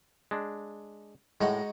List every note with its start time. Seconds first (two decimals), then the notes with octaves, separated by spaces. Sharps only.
0.31 G#3 D4
1.41 A2 G#3 D#4 F#4